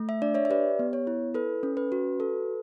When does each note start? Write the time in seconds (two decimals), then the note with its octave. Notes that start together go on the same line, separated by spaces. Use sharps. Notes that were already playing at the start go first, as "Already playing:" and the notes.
Already playing: A3
0.09 E5
0.22 D4 D5
0.34 C#5 E5
0.45 E5
0.50 G4 B4 D5
0.79 B3
0.93 C#5
1.07 E4
1.34 A4 B4
1.63 C#4
1.77 B4
1.92 F#4
2.20 A4